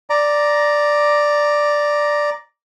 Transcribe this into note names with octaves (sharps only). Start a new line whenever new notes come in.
D5 A#5